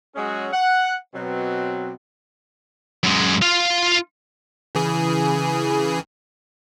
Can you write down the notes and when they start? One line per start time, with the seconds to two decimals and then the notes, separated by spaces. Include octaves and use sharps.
0.16 F#3 G#3 C#4 F#4 G#4
0.53 F#5
1.14 B2 F#3 C4
3.03 F#2 G#3
3.42 F4 F5
4.75 C#3 E3 G#4